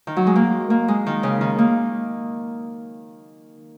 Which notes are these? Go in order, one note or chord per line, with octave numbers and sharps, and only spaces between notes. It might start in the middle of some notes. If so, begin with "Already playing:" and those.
D#3
F#3
G#3
A#3
A#3
G#3
D#3
C#3
D#3
A#3